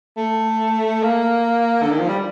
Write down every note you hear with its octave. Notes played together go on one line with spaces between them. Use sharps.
A3
A#3
D3
D#3
F3
G3